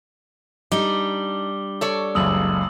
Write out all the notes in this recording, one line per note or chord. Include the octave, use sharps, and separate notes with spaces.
G3 D4 D#4 D6 G7
A4 C#5 D5
F#1 C#2 F#2 D#6 E6 F#7